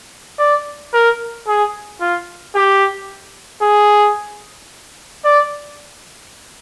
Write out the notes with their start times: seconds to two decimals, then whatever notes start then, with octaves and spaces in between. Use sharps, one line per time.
0.39 D5
0.93 A#4
1.47 G#4
2.00 F4
2.55 G4
3.62 G#4
5.24 D5